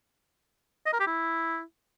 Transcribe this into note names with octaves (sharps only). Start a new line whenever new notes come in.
D#5
A#4
G4
E4